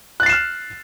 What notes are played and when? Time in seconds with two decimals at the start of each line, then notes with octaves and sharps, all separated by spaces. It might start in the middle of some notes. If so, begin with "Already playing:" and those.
0.20 F#6
0.23 A6
0.26 C7
0.29 E7
0.33 F6